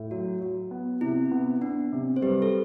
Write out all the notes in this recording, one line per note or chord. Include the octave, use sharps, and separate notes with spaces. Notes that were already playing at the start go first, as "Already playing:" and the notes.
Already playing: A2
F#3 F#4
F#3
B3
C3 E4
B3
B3 D4
C3
C5
G3 G4 B4
A4